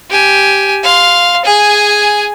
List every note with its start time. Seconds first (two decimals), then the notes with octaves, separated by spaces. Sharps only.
0.10 G4 G#5
0.83 F5 C6
1.45 G#4 G#5